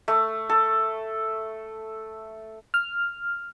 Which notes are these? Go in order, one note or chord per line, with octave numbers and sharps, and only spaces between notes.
A3
A4
F6